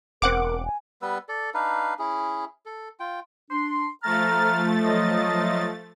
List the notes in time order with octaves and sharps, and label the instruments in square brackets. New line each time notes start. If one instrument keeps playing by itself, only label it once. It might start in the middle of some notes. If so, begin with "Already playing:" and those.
[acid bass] E1 [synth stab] C4 F#5 D6 [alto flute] A#4
[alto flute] G#5
[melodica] G3 B3 B4 E6
A4 D5
D4 D#4 B4 F5
C#4 E4 G#4
A4
F4 G5
[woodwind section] D4 C6
[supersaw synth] F3 A3 A6 [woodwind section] A#5 F6
[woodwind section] F#3 F4 D#5